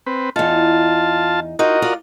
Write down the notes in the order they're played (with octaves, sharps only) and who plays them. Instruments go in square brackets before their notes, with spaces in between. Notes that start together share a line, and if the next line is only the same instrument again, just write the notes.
[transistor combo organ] C4 B4
[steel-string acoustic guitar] E2 D#4 [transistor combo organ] F4 A5
[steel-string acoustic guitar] D#4 F4 [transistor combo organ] F#4 A#4 D#5
[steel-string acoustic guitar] F4 D5